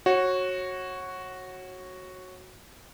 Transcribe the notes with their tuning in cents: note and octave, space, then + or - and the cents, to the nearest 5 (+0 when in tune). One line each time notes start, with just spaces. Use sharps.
F#4 +0 C#5 -25